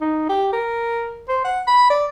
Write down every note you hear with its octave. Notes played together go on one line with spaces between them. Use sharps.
D#4
G4
A#4
C5
F#5
B5
D5